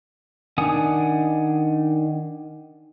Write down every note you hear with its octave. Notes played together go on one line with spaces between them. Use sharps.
D#3 D4 F#5 G#5 D#6